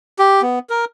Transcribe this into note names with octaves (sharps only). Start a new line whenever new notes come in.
G4
B3
A#4